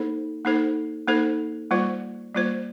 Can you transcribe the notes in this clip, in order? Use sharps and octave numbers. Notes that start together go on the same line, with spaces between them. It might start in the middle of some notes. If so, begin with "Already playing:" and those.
Already playing: A#3 D#4 A4 C5
A#3 D#4 A4 C5
A#3 D#4 A4 C5
G3 A#3 F4 C5
G3 A#3 F4 C5